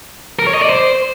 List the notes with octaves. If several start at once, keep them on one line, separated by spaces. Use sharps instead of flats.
A#4
C#5
D#5
D5
C5